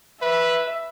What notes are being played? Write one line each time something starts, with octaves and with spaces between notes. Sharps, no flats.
B4 E5